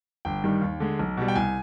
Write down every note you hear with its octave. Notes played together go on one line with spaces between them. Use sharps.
G1 G5
G2 D#3 G3
D#2
D3 G#3
B1
B2 G3
G5
C2 G#5